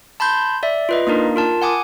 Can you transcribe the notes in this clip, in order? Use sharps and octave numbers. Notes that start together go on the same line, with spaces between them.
A5 B5 C6 G6
D5 E5
F4 B4 D#5
A#3 D4 D#4 A#4
F4 A#4 A5
F#5 G#5 D6 D#6